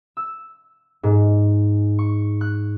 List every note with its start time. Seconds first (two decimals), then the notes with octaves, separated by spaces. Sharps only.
0.17 E6
1.03 G#2
1.99 C#6
2.41 F#6